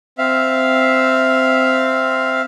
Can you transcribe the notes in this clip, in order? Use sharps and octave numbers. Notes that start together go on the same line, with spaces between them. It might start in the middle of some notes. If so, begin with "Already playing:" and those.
C4 E5 F5